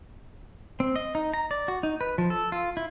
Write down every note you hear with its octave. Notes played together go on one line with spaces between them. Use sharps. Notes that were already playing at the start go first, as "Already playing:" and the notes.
C4
D#5
D#4
A#5
D5
F#4
D#4
B4
F3
A4
F4
E4